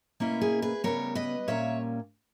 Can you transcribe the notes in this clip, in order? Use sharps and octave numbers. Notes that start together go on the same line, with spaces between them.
B2 A#3 C#4 E4
G#4
G#4 B4
C#3 G3 B3 A#4 C#5
B4 D#5
A#2 G3 A#3 C#4 C#5 E5